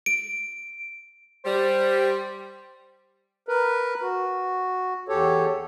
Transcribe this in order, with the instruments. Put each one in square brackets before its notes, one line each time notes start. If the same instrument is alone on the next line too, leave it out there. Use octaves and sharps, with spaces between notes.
[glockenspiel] D7
[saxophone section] G3 [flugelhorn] C5
[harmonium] A#4 B4
F#4
E2 G4 A4 C#5